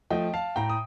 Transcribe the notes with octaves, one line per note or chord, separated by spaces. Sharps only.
F3 A3 D#5 G5
F5 A5
A2 G5 A#5
D#6